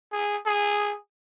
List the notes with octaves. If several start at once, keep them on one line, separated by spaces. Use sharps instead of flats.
G#4
G#4